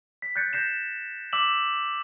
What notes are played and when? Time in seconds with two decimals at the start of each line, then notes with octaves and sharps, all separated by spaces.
0.22 B6
0.36 F#6 G6 A6 C#7
0.53 G6 A#6 C7 E7
1.33 D6 E6 B6 E7 F#7